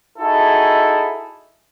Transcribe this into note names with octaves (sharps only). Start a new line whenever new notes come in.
D#4 E4 F#4 G#4 A4